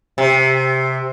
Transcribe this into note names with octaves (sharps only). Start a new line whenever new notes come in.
C3